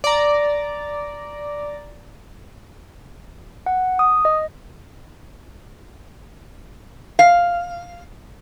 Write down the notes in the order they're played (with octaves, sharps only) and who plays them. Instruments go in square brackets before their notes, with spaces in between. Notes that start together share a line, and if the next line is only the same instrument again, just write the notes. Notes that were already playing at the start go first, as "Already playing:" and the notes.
[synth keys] D5 A#5
[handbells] F#5
D#6
D#5
[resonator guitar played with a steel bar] F5